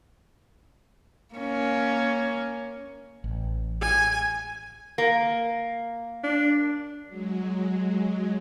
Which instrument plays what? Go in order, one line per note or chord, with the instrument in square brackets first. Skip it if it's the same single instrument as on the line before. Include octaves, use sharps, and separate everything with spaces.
[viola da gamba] A#3 C#4
[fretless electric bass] A1
[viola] G#5
[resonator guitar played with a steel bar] A#3
[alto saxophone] D4
[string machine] F#3 G#3